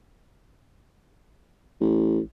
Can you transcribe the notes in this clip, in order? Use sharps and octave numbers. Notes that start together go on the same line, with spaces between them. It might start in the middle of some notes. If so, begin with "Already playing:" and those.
A1